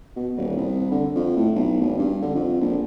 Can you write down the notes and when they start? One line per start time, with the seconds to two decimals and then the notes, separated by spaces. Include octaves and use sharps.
0.16 B2
0.37 D#1
0.57 C2
0.91 D3
1.15 F2
1.36 A2
1.55 B1
1.81 G#1
1.99 G2
2.22 D3
2.35 F2
2.61 A#1